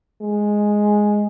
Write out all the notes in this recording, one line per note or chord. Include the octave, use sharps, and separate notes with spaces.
G#3